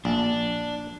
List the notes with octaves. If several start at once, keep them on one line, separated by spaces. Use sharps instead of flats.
A#1 D4